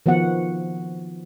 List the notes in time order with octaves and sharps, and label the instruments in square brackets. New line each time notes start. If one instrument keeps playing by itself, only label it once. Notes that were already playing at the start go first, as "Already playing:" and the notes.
[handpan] D#3 F3 B3 F#4 F#5